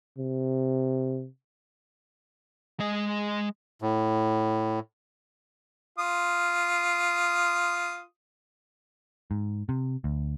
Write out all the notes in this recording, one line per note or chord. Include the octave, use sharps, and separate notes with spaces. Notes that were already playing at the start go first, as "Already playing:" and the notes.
C3
G#3 D#5
A2
F4 D#6
G#2
C3
D2